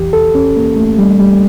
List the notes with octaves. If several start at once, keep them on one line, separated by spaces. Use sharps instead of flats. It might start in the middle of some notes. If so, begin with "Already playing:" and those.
Already playing: E2 E3 G4
A4
C#4
A#3
A3
G3
G3